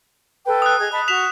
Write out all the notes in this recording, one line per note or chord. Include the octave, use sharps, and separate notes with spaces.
A4 B4 G5
D#6 F#6
G#4 D#5 G#6
D#5 A5 B5
F#4 B6 E7 F7